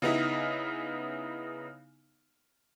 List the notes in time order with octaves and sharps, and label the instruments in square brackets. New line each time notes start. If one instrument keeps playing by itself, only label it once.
[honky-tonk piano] C#3 B3 D#4 E4